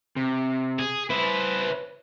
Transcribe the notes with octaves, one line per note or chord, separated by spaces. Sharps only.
C3
G#4
E4 B4 C5